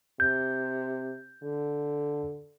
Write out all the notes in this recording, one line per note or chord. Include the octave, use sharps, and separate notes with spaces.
C3 G6
D3